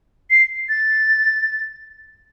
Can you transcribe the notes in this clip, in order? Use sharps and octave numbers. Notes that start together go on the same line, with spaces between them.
C7
A6